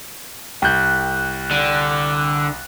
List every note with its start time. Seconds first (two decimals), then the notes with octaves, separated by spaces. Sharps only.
0.62 C2 G5 F#6 G6
1.51 D3